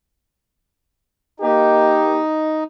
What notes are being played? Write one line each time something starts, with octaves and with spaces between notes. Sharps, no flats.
A#3 D#4 G4